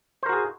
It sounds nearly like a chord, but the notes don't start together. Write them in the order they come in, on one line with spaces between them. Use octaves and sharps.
C5 A#4 F#4 G#4